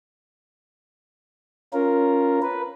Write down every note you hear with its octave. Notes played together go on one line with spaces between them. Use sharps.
C#4 F4 A#4
B4